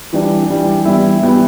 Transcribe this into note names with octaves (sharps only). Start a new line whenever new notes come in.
E3 G3 D4
E3 G3 D4
E3 G3 B3 E4
E3 G3 B3 E4